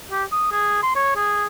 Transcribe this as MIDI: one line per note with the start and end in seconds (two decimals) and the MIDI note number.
0.11 0.24 67
0.32 0.49 87
0.52 0.83 68
0.83 0.93 84
0.96 1.15 73
1.16 1.46 68